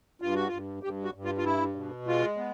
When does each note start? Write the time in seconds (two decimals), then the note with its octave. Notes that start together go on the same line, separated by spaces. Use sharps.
0.22 G2 F4
0.35 F#4
0.47 F4
0.53 G2
0.83 G2 G4
1.04 F#4
1.14 G2
1.25 F4
1.38 F4
1.45 E4
1.75 B2
2.07 G#3 F4
2.37 B3